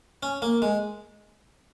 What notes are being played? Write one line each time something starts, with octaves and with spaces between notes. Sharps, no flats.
C#4
A#3
G#3